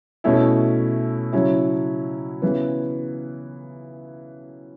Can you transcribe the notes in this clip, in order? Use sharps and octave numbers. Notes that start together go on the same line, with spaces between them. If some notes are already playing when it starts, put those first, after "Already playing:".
B2 A3 C#4 E4
C#3 F#3 C#4 E4
C#3 E3 B3